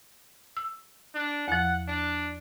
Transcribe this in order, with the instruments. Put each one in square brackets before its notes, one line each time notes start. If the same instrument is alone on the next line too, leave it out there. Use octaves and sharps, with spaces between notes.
[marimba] E6
[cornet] D4
[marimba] E2 F3 [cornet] F#5
[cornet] D4